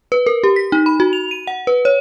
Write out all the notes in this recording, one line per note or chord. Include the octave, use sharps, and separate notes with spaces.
B4
A#4
G4
B6
D#4
B5
F#4
F7
D#7
F#5
B4
C#5